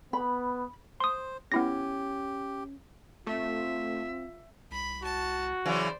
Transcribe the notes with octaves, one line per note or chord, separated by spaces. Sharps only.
B3 B5
C5 C6 D#6
B3 C#4 E4 G4 A#6
A3 C4 F4 E5
C2 B5
F#4 A5
C#3 E3 F#3 C5 D5